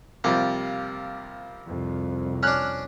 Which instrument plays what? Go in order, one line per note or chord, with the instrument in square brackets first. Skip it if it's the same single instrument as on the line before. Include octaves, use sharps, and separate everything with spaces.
[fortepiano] C3 F3 G3 [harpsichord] A#3
[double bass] C2 F2
[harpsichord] C#4 D4 [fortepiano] F6 F#6